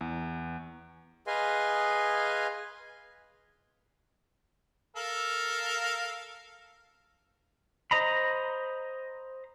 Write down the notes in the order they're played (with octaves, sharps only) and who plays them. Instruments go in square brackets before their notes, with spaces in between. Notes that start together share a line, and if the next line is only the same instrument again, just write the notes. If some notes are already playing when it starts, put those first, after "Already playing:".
[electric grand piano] E2
[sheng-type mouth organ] G#4 B4 D#5 F5 G#5 C6
[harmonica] A4 A#4 F5
[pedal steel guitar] C5 D#5 A#5 B5